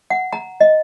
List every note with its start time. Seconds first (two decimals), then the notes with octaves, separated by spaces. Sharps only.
0.10 F#5
0.33 A#5
0.61 D#5